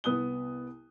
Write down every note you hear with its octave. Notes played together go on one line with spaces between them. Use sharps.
C2 B3 D#6 F#6 G7